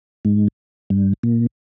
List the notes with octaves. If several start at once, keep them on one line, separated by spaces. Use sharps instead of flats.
G#2
G2
A#2